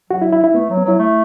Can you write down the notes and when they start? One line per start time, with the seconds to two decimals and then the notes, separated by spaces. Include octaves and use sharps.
0.10 F#3 F#4
0.22 E4
0.32 E4
0.44 E4
0.54 A3 B3
0.70 F#3
0.77 B3
0.85 F#3 E4
0.99 A3